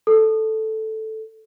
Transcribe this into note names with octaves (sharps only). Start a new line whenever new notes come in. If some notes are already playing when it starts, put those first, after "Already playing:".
A4